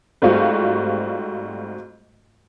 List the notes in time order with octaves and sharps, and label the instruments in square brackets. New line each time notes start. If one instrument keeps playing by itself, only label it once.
[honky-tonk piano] G#2 G3 A3 C4 F4 F#4